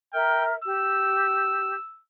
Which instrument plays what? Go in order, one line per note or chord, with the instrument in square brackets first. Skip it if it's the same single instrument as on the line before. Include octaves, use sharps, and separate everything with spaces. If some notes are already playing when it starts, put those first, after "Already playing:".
[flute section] A#4 E5 F6 [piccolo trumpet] G5
[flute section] G4 [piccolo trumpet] E6